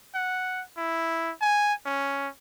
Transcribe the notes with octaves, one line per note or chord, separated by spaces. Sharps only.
F#5
E4
G#5
C#4